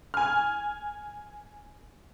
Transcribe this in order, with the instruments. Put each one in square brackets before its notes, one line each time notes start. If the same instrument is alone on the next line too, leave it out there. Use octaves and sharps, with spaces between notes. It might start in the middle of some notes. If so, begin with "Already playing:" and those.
[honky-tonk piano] G#5 F6